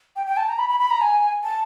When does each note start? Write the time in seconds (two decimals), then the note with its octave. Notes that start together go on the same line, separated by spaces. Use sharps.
0.16 G5
0.27 G5
0.37 A5
0.48 A#5
0.58 B5
0.69 B5
0.80 B5
0.91 A#5
1.01 G#5
1.44 A5